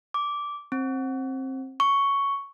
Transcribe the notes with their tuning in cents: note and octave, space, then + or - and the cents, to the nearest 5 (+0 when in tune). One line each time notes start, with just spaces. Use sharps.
D6 -10
C4 +20
C#6 +5